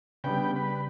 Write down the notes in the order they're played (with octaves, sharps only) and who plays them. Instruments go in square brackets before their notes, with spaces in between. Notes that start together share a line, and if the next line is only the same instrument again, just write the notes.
[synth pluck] C#3 [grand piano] G3 D4 [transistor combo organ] B3 G5
[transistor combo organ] B4